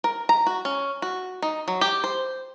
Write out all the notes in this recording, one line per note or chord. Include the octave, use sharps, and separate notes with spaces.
A#4
A#5
F#4
C#4
F#4
D#4
F#3
G4
C5